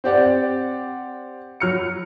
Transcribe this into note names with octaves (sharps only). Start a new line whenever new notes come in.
C4 G4 D5 F#5
F#3 F6 C#7